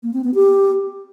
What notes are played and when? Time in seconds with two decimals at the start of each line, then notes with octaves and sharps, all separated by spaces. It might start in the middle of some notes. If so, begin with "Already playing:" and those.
0.03 A#3
0.13 C4
0.24 B3
0.34 G4